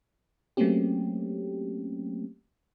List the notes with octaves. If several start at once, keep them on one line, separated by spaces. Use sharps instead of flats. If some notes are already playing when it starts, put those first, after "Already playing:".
F#3 A3 A#3 C4 C#4 G4